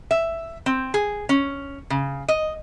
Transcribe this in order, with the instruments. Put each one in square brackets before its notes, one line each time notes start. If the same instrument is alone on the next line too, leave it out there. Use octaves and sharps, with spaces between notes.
[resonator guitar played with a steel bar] E5
C4
G#4
C#4
C#3
D#5